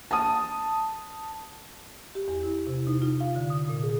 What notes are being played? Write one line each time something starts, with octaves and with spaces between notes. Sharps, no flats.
A5 D#6
G4
E2
E4
C3
D#4
F4
F5
D3
D#6
A#2
G#4